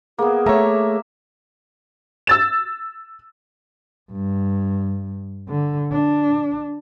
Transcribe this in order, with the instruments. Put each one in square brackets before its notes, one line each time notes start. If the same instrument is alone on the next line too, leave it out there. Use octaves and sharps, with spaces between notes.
[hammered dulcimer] A#3 B3 [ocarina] G#4
[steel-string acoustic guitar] A3 C#5 [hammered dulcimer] E5 A#5
[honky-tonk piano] E6 A6 E7
[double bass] G2
D3
D4